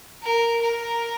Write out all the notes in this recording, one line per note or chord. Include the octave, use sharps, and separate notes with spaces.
A#4
A#4